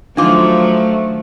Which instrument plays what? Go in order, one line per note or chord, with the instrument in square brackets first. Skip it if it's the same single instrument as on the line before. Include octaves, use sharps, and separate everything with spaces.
[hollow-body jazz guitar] D#3 F4 C5 [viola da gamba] F3 F#3 [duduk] A3 [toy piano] D4 D6